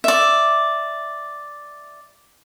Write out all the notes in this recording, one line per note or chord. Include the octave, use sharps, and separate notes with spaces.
D5 E5